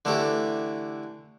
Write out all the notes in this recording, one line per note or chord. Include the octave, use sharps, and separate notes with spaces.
D3 E3 A3 E4 G4